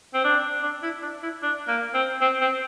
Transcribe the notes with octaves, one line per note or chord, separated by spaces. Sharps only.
C4
D4
D4
E4
D4
E4
D4
A#3
C4
C4
C4